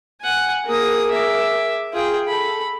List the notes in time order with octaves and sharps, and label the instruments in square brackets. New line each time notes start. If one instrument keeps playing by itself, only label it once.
[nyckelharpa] F#5 G#5
[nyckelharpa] A#3 D#6 [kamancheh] G#4 A#4
[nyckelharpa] E5 D6
[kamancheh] F4 [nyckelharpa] G#4 G5
[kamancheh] A4 [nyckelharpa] B5